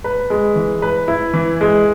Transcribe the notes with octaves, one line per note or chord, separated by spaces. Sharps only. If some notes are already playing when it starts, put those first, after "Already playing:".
B4
G#3
E3
B4
E4
E3
G#3